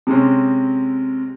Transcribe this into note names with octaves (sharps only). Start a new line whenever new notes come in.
C3 G#3 C4 C#4